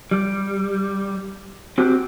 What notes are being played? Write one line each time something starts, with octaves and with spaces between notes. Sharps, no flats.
G3
C4 F#4 G4